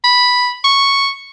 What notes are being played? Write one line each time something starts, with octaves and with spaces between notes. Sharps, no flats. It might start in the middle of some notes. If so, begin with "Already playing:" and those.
B5
C#6